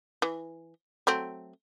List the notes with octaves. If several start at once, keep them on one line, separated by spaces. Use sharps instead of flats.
E3
F#3 A3 C4